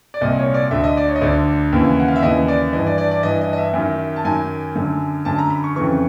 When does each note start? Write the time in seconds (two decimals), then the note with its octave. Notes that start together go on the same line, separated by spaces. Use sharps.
0.14 D5
0.21 C2 A#2 D#5
0.38 C#5
0.54 D5
0.71 D2 D3 E5
0.84 D#5
0.97 D5
1.09 C#5
1.16 D#5
1.21 D2 D3 D5
1.72 D#2 C#3 E3
1.99 F#5
2.08 F5
2.16 E5
2.22 D#2 C#3 E3 D#5
2.48 D5
2.73 G2 E3 D#5
2.86 D5
2.98 D5
3.11 D5
3.23 G2 E3 D#5
3.41 D#5
3.53 D#5
3.58 E5
3.74 F#2 D#3
4.16 A5
4.25 F#2 D#3 G#5
4.75 F#2 D3
5.25 F#2 D3 A5
5.38 A#5
5.50 B5
5.64 C#6
5.76 F2 C#3 E3 C#6